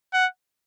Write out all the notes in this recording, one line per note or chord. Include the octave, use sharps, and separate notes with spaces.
F#5